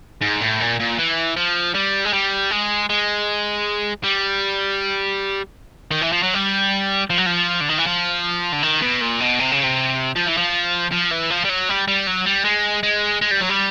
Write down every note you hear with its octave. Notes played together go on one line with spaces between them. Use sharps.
G#2
A2
A#2
A#2
E3
F3
G3
G#3
G3
G#3
G#3
G3
D#3
E3
F3
F#3
G3
F3
F#3
F3
D3
D#3
E3
F3
D3
D#3
B2
A#2
B2
C3
C#3
C3
F3
E3
F3
F3
E3
F3
G3
F#3
G3
G3
F#3
G3
G#3
G#3
G#3
G3
F#3
G3